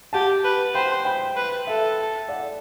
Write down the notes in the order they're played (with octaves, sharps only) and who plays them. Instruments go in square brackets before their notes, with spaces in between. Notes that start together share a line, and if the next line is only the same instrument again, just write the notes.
[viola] G4 [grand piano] F#5 A5
[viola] B4
[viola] C5 [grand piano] G5 B5
[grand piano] G5 B5
[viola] B4
[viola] A4 [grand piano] E5 G5
[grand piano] D5 F#5